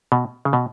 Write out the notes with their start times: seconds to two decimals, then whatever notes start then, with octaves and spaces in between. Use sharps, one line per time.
0.12 B2
0.45 C#3
0.53 B2